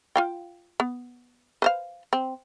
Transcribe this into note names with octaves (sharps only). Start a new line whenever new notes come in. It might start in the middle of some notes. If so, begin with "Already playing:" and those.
F4 F5 G5
B3
B4 C5 F5
C4